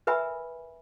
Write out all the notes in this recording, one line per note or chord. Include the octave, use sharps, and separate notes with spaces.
A#4 B4 E5 G#5 B5